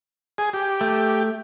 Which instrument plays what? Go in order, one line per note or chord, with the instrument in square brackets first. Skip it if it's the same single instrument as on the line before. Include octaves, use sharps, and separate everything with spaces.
[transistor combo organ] G#4
G4
[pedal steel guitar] A3